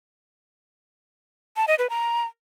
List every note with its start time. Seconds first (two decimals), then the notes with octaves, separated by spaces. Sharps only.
1.57 A5
1.68 D#5
1.79 B4
1.90 A#5